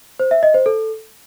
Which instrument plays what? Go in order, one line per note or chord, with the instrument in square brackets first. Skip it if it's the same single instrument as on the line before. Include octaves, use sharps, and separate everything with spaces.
[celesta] C5
E5
D#5
C5
A4